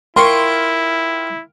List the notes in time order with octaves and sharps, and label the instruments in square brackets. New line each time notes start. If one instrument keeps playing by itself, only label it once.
[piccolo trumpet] E4 [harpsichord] F4 A#4 G5 [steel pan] C6 C#6